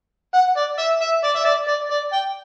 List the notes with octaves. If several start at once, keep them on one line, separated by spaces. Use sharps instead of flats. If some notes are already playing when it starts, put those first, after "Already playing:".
F#5
D5
E5
E5
D5
E5
D5
D5
D5
G5